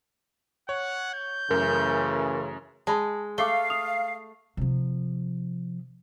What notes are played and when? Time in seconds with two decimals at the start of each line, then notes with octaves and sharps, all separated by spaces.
0.69 C#5 F#5
1.14 G6
1.51 F#2 C#3 E3 A3 A#4
2.87 G#3 A5 B5
3.38 A3 F5 D6 C7 G7
3.70 D#6 F7
4.57 C3 F3